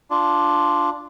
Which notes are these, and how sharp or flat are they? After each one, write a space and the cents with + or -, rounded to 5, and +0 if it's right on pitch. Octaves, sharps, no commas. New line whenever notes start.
D4 +0 F4 -5